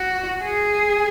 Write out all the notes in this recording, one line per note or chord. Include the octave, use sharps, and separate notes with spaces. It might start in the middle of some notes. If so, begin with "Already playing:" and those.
Already playing: F#4
G#4